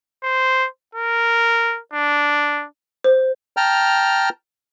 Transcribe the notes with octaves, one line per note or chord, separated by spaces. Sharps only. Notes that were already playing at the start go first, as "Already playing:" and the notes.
C5
A#4
D4
C5
G5 A5 A#5 F6